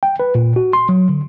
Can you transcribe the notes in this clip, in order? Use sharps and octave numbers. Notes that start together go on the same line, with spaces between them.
G5
B4
A#2
F#4
C6
F#3
D3